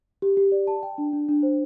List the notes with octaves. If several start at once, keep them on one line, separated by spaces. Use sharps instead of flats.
G4
G4
D5
A5
G5
D4
D4
D4
C5